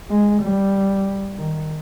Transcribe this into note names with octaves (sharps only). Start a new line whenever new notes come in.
G#3
G3
D#3